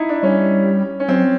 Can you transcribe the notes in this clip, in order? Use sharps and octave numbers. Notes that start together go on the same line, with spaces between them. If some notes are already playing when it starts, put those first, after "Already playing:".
Already playing: D#4 E4
D4
G3 C#4
C#4
F#3 C4